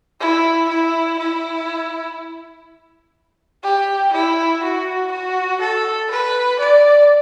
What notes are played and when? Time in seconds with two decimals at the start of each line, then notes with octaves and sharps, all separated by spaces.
0.20 E4
0.69 E4
1.19 E4
3.64 G4
4.13 E4
4.63 F#4
5.11 F#4
5.61 A4
6.11 B4
6.59 D5